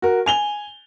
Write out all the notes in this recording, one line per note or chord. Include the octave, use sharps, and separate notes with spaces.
F#4 A#4
G#5 F7 G7